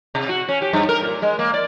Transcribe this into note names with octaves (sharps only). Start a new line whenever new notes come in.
C3
F#4
C#4
G4
G2
A#4
A#2
G#3
A#3
D5